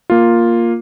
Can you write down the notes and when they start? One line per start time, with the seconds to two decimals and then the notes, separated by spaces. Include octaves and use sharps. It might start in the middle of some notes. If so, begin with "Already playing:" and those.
0.10 A#3 F4